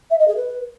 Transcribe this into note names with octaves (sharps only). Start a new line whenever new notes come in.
E5
D#5
G#4
B4